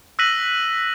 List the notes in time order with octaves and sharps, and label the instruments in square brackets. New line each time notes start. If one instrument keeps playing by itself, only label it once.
[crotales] E6 F#6 A#6 B6 D#7 F#7